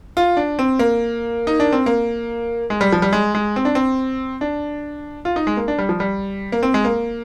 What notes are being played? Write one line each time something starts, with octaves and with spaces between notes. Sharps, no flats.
F4
D4
C4
A#3
D#4
D4
C4
A#3
G#3
G3
F3
G3
G#3
G#3
C4
D4
C4
D4
F4
D#4
G#3
A#3
D4
G3
F3
G3
A#3
C4
G#3
A#3